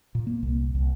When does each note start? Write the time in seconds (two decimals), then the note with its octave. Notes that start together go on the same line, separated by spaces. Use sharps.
0.15 A#2
0.27 A#3
0.43 C2
0.75 C2